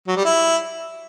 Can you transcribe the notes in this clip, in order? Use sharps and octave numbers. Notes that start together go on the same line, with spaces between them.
F#3
G3
E4